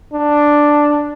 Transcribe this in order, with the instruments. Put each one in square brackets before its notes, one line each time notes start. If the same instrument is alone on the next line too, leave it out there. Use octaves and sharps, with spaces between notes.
[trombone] D4